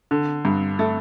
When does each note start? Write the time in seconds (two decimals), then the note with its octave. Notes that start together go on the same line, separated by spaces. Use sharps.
0.11 D3
0.45 G2
0.79 A3